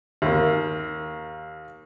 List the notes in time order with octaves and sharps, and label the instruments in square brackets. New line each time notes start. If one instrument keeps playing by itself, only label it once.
[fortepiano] D#2 A#3